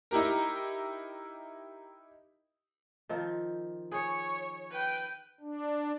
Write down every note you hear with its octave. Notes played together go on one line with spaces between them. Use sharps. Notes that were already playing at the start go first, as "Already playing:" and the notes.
D#4 E4 G4 A#4
D#3 F3 C4
G#4 C#5
B4 G5
D4